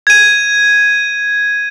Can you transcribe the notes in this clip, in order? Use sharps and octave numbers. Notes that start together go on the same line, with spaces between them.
G#6 D#7